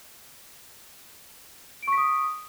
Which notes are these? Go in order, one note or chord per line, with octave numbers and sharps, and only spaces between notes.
C#6 D#6 B6 D7